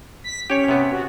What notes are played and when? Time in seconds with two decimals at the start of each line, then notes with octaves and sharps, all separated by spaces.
0.24 B6
0.50 C#4 G4 C#5
0.68 C3 B3
0.92 F#4